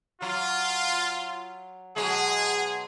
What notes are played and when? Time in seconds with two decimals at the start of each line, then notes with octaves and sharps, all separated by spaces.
0.22 F#3 F4
1.96 B2 F#3 G#3 G#4